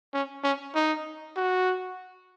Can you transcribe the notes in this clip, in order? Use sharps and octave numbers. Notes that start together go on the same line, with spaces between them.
C#4
C#4
D#4
F#4